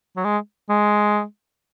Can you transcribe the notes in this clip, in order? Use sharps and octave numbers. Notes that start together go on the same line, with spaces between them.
F#3
G#3
G#3